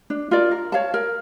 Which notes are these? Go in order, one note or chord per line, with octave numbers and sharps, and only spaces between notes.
D4
F4 A#4 D5
A#4
C#5 F5 A5
A#4